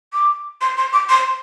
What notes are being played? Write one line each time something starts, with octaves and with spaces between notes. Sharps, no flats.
D6
C6
C6
D6
C6